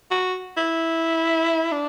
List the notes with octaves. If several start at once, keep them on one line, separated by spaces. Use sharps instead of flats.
F#4
E4
D4